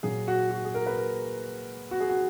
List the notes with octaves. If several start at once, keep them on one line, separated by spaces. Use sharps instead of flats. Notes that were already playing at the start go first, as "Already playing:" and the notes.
A#2 F#3 G#4
F#4
F#4
G#4
A#4
B4
A#4
F#4
G#4
F#4